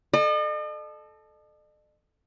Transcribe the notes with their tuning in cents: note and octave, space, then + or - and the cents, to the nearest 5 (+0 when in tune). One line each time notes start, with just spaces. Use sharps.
A4 -15 D#5 -45